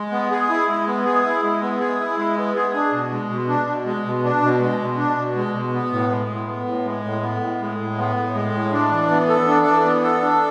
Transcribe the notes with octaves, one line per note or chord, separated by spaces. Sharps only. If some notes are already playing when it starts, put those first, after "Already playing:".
Already playing: G#3
B3
G#4
E4
G#3
B3
G#4
E4
G#3
B3
G#4
E4
G#3
B3
G#4
D4
B2
G#3
B2
D4
B2
G#3
B2
D4
B2
G#3
B2
D4
B2
G#3
B2
B3
A2
G#3
A2
B3
A2
G#3
A2
B3
A2
G#3
A2
B3
A2
G#3
A2
D4
E3
B3
A4
D4
E3
B3
A4
D4